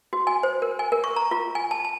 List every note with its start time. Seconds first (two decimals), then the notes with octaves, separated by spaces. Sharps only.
0.13 F#4
0.27 G#5
0.43 C5
0.62 A#4
0.79 G#5
0.92 A#4
1.04 C#6
1.16 A#5
1.31 F4
1.55 G#5
1.71 A5
1.85 A5